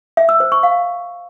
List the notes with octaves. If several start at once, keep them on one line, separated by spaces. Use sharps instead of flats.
E5
E6
C5
C#6
F5